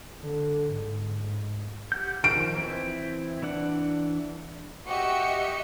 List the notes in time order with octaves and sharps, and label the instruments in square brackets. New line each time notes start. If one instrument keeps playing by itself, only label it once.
[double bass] D3
G#2
[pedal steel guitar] G4 F#5 G6
[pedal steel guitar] D#3 F3 [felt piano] D7
[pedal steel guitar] E3 C4 E4
E3 D4 F#5
[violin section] F#4 G4 D#5 E5 C#7